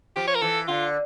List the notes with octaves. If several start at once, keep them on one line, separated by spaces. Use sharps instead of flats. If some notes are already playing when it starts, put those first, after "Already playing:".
F3 G4
C#5
A#4
E3 A4
D3 F4